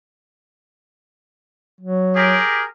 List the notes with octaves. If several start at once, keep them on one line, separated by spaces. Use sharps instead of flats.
F#3
G4 G#4 A#4